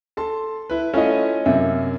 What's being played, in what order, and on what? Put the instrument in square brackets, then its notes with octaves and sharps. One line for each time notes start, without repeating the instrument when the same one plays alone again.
[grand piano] A4 A5 C6
E4 B4
[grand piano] A3 E4 F4 [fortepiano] C#4 D#5
[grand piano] F#2 C3 A#3 [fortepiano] E5